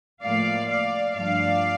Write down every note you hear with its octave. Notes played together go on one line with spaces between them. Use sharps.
A2 F3 A#3 D5 F5
D5 F5
G2 F3 A3 D4 D5 F5